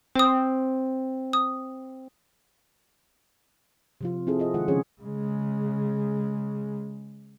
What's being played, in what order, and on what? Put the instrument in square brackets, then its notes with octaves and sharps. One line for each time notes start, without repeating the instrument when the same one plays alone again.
[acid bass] C4 [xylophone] C5 D#6
[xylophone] D#6
[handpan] C3 F3 F4
C4 E4 G#4 A4
F4 G#4 D#5
D#3 G#3 F4 F#5
C#3 F3 C#4 G#4 C#5
[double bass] C#3 G#3